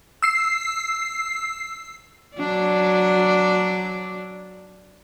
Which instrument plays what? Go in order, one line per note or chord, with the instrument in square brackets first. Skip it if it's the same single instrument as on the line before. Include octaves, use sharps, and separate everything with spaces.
[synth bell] E6 C7
[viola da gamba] F#3 D4 D5